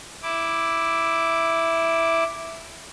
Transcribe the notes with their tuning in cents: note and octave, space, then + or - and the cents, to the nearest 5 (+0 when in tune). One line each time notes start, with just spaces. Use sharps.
E4 +0 D6 +0